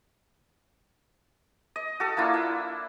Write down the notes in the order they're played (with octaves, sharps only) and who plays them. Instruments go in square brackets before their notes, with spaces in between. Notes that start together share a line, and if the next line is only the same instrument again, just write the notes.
[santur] D#5
F#4 A4
A#3 D4 E4 F4
E5